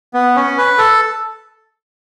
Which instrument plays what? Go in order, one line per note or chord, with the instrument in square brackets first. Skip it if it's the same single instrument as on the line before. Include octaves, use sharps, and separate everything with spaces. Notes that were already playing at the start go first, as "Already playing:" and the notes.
[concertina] B3
C#4
B4
A4